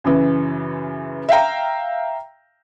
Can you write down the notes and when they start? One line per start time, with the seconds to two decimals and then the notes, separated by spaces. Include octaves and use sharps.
0.04 F#2 C#3 E3
1.29 E5 F5 G5 A#5